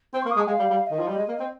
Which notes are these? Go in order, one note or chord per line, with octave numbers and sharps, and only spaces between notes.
C4 C6
A#3 C#6
D#6
G#3
G#5
G#3 F5
G3
G3
F5
D#3 D#5
F3
G3
G#3
A#3
C4